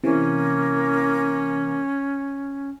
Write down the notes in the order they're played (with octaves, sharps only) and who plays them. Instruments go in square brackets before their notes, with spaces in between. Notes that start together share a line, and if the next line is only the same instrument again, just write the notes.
[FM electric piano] C3 E3 [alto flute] A#3 [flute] C#4